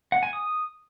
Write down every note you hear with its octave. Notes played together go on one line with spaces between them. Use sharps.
F#5
G#5
D#6